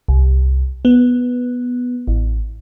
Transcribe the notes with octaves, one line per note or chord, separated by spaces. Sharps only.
C2
B3
A1